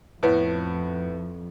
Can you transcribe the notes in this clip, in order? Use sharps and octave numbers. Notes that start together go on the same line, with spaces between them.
F2 A2 B3